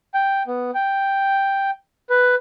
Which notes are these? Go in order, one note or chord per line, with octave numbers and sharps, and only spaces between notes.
G5
B3
G5
B4